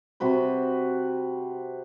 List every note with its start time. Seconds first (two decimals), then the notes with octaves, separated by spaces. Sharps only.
0.20 C3 F#4 B4 C5